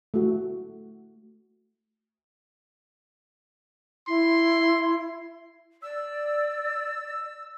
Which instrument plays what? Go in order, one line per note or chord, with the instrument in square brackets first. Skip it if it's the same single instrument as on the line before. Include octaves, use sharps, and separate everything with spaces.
[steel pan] A3 F#4
[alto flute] E4 [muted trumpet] C6
[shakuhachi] D5 [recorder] E6